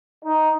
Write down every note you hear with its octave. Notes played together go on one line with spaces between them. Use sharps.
D#4